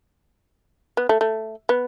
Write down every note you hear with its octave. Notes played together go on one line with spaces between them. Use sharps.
B3
A3
A3
B3